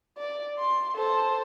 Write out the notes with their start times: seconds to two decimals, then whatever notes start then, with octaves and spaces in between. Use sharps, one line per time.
0.18 D5
0.59 C6
0.96 A4 C5